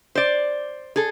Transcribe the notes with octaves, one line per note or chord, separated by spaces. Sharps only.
C5 D5
G#4 A4